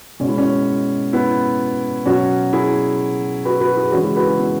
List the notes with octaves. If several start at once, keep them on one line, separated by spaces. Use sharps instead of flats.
B2 G#3 C#4
E4
C#4
B3 E4
B2 F#3 C#4 F#4
E4 G#4
F#4 B4
F#4 B4
E4 G#4
C#3 E3 G#3 C#4 F#4
E4 G#4
F#4 B4
E4 G#4
B3